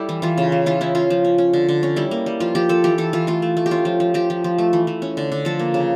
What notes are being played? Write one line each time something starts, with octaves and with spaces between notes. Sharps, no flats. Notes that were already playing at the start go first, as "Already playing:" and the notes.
Already playing: G3 E4 G4 A4
E3
E3 F4
C#3
E3
E3 F4
C#4 E4
C#4 F4
F3
C#4
C#4
D3
D3
C#4
G3 E4
A#3
G3
F3 F4
F3 G4
F3 A4
E3 G4
E3 A4
E3 F4
A3 F4
A3
A3
G4
C#4 F4
F3
F3
F3 G4
F3
F3
A3
E3
E3
C#4
D3
D3
F3 A4
A#3
C#3